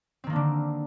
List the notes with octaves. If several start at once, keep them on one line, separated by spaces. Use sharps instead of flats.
D3 D#3 A#3 C4 D4